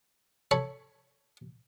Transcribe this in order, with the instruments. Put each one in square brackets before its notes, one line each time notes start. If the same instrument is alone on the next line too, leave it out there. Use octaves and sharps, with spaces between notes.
[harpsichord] A4 C#5 B5